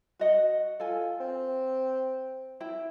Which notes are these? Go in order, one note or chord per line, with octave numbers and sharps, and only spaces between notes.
F#4 D#5 F#5
F4 A4 G#5
C4
E4 G5